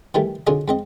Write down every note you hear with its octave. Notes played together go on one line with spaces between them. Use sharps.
D#3 E3 G3 A3
B1 D3 F#3 F4 G#4 D#5
G#2 C4 D#5